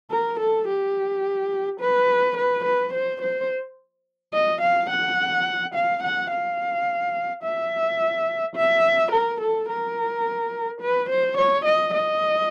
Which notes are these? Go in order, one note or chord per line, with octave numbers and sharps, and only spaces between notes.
A#4
A4
G4
B4
B4
B4
C5
C5
D#5
F5
F#5
F5
F#5
F5
E5
E5
A#4
A4
A#4
B4
C5
C#5
D#5
D#5